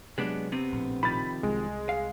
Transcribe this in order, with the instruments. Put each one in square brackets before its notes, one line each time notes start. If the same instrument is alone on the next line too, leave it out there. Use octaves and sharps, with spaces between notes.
[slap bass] C3 F#3 [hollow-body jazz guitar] G#3 B3 D4
[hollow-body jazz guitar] C3 B3 C4
[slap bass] A#1 A2
[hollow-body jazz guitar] C3 D#3 F3 [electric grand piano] B5 A6
[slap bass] C2 [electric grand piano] G#3
[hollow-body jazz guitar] F5